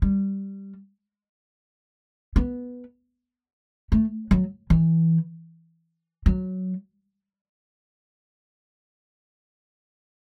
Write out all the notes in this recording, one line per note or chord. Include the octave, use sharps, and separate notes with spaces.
G3
B3
A3
F#3
E3
F#3